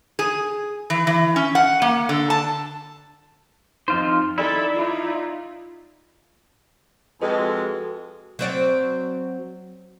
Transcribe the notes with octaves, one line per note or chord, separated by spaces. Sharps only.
G#4
E3
E3
C#4
F#5
A#3
D3
A5
F2 D#4 F4 C5
D#4 E4 A4 D5
D#4 F4
F2 G#3 F#4 A4 B4
F#3 C4 D5